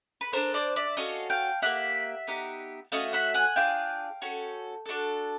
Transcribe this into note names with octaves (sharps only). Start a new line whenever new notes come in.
B4
D4 F#4 A4 A#4 C5
C5 D5
D5 E5
C#4 F#4 A4 D#5 F5
F5 G5
A#3 D4 G4 E5 F#5
B3 D#4 G4
A3 C#4 F#4 D#5 F5
E5 F#5
F#5 G#5
D4 F4 G#4 F5 G5
C#4 F#4 A4
D4 F#4 A4